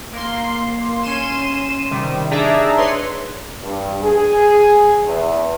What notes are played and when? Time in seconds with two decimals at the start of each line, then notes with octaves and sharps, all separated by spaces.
0.12 A#3 C6
1.03 C#4 C6 D#7 E7
1.91 C3 D#3 G3
2.31 D4 D#4 G#4 D5 E5 A#5
2.77 B4 C#5 C6
3.62 G2
4.03 G#4
5.05 E2